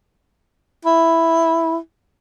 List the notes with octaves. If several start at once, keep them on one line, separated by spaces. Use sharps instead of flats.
E4